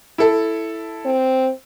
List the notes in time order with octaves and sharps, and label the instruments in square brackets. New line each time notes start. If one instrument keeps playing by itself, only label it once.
[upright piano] E4 A4
[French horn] C4